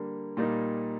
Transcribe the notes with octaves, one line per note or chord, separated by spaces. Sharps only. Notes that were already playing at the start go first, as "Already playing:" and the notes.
Already playing: D3 G3 A#3
A#2 G3 A#3 D#4